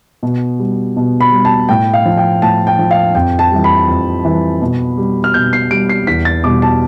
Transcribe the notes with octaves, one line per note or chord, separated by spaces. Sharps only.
B2
G3
B2
B5
G3
A5
A2 G5
F5
F3
G5
A2 A5
G5
F3
F5
F2 G5
A5
E3 G3
B5
F2
E3 G3
B2
G3
F6
B2 G6
C7
G3 D7
C7
E2 B6
A6
B2 G3 D6
A5